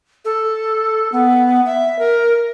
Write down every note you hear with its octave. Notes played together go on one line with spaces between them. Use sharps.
A4
B3
E5
A#4